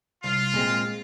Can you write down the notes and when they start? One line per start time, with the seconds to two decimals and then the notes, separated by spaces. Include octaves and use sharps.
0.23 C2 F4
0.54 A#2 G#3 C4